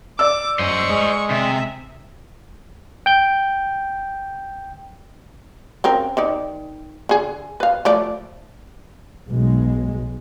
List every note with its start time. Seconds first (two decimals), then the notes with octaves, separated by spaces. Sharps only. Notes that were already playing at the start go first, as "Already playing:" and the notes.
0.19 D5 D6 E6
0.59 F#2 C5 D#5 C#6
0.90 G#3
1.30 C3 E5
3.06 G5 G6
5.84 C#3 C4 A#4
6.17 D#3 D#4 D5
7.09 D3 G#4
7.60 B4 F5
7.85 F3 A3 D5
9.28 B1 G#3